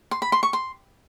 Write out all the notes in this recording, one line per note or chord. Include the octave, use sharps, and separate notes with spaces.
C6
B5
C6
C#6
C6